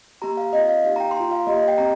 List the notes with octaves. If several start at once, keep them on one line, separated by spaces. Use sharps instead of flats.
A#3 G4 A#5
F5
C4 F4 D#5
F5
A#3 D#4 G4 F5
A#5
G5
C6
A#3 F4 A#5
F5
A#3 G4 D#5
D#5
G5
C4 G4 A#5